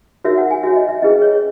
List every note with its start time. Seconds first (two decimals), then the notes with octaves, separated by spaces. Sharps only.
0.24 D#4 F#4 A#4 C#5 E5
0.38 F#5
0.51 G#5
0.63 F#4 C#5 E5
0.76 D#5
0.89 E5
1.02 C#4 E4 G#4 B4 D#5
1.22 C#5